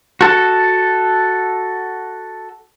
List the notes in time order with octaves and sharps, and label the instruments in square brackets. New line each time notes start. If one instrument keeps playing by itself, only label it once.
[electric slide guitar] F#4 A4